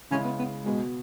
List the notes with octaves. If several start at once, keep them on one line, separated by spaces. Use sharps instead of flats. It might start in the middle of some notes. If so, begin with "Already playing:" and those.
C#3 G#3 C#4 E4
B3
B3
B2 G#3 B3 F#4